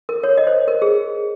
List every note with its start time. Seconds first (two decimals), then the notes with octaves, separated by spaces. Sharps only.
0.09 A#4
0.24 C#5
0.38 D#5
0.47 C5
0.68 A#4
0.82 G#4